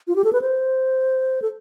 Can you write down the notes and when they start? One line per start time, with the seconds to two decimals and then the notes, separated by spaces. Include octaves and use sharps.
0.08 F4
0.16 G4
0.24 A4
0.33 B4
0.42 C5
1.42 A4